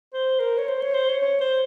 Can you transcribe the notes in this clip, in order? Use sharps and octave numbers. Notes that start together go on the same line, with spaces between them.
C5
A#4
C#5
C5
C#5
C5
C#5
C#5
C5